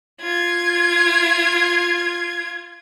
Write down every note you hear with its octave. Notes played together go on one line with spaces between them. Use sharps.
F4 G#6